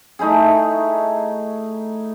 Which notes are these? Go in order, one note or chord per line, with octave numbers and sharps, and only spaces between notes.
A3 D#4 E4 G#4